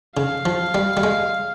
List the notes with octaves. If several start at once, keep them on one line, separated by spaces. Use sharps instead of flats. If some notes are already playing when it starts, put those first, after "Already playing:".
C#3 F5
F3
G3
G3
G#3